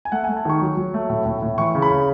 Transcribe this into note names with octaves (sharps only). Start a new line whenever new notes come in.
G#5
A3 F#5
A3 G#5
A5
D#3 C#6
F#3
F#3
A3
A2
A2
A2
E3 C#6
C#3
B5
C#3